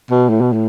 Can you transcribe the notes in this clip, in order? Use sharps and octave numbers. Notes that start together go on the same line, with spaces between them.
B2
A2
B2
A2